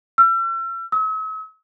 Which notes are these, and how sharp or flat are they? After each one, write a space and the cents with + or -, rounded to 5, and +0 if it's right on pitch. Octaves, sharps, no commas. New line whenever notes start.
E6 +40
E6 -45